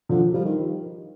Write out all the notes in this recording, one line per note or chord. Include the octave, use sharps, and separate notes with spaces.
D3 F3
F3 G3
D#3